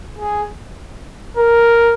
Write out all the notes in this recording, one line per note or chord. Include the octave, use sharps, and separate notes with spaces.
G#4
A#4